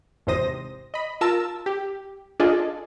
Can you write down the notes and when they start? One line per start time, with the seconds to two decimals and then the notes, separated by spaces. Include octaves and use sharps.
0.27 G#1 E2 C3 C5 D#6 A#6
0.94 D#5 B5
1.21 F4 A#4 A5 E6
1.66 G4
2.40 D4 F4 G#4 A4 D5 D#5